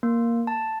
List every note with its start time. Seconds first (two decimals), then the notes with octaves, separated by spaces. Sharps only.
0.03 A#3
0.47 A5